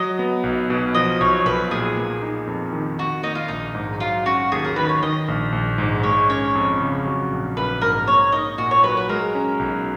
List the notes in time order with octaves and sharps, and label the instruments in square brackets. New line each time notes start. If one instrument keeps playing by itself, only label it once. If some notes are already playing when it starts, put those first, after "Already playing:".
Already playing: [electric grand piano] F#3 [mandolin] D#5
[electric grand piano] B3
B1
B2
[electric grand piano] F3 [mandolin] D#5
[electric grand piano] B1 [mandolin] C#5
[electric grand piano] B1 [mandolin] B4
[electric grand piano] A#2 [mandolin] G#4
[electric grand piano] A#3
D#4
F2
D#3
[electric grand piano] D#3 [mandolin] F#4
[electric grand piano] A#3 [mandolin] D#4
[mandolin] F4
[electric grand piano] A#1 [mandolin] D#4
[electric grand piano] G#2
[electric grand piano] F#3 [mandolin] F4
[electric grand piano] C#4 [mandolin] F#4
[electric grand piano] D#2 [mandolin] G#4
[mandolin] A#4
[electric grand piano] D#3 [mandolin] B4
[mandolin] C#5
[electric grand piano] D#3 [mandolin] D#5
[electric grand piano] A#1
A#1
G#2
[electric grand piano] G#3 [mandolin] C#5
[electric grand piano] C#4 [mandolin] C#5
[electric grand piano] F2
C#3
F#3
A#1
[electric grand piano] A#1 [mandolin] B4
[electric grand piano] G#2 [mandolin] A#4
[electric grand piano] A#3 [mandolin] C#5
[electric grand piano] D#4 [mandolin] D#5
[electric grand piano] A#2 [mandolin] F#4
[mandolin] C#5
[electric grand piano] F#3 [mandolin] B4
[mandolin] B4
[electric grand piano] G#3 [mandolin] A#4
[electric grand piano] C#4
B1